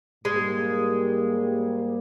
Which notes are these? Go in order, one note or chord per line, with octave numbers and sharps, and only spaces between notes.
G#2 G3 G#3 A#3